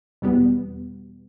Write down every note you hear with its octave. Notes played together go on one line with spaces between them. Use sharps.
E2 B2 G3 B3